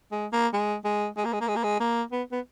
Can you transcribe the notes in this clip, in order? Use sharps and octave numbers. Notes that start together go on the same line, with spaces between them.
G#3
A#3
G#3
G#3
G#3
A#3
G#3
A#3
G#3
A#3
G#3
A#3
B3
B3